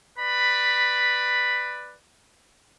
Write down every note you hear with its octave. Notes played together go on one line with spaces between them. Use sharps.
B4 D5 B5